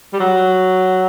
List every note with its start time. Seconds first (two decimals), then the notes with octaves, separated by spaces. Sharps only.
0.13 G3
0.20 F#3